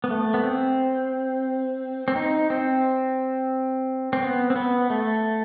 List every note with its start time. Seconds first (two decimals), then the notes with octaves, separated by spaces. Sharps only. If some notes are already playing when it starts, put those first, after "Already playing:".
0.04 B3
0.10 A3
0.34 B3
0.44 C4
2.08 C4
2.16 D#4
2.50 C4
4.13 C4
4.23 B3
4.50 C4
4.56 B3
4.90 A3